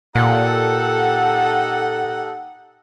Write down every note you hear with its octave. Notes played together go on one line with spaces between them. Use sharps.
A#2 D#4 G4 A4 F#5